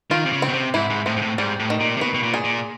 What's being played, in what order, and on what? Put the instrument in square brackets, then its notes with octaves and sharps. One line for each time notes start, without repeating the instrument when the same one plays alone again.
[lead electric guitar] D#3 [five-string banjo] F4
[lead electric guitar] C3
C#3
[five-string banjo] C4
[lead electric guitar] B2
C3
[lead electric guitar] G#2 [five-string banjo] E4
[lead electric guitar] G#2
[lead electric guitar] A2 [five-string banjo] C4
[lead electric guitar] G#2
A2
[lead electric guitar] G#2 [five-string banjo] G3
[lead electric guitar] A2
[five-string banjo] D#3
[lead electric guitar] A#2
C3
[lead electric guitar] B2 [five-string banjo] B4
[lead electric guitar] B2
A#2
[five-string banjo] G#4
[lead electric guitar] A#2